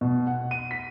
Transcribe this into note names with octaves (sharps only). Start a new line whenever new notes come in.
B2
F#5
D#7
B6